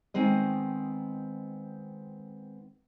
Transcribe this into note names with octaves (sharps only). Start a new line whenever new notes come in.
D#3 G#3 B3 C4 D#5